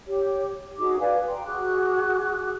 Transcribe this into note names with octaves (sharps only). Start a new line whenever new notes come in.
G4 C#5
D#4 F#4 G#4 D6
B4 D5 F5 G#5
G5 A#5 C6
F#4 G#4 D6 F#6